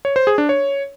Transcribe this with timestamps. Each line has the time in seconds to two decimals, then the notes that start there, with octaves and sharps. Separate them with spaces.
0.05 C#5
0.16 C5
0.27 G#4
0.38 D4
0.49 C#5